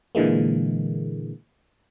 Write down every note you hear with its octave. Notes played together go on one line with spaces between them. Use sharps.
A#2 D3 E3 G#3 A#3